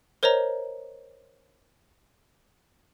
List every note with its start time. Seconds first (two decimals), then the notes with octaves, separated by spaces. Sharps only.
0.23 A#4 C5 C#5 D#5 A#5